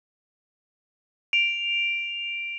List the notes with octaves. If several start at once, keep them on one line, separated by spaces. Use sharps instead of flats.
D7 F7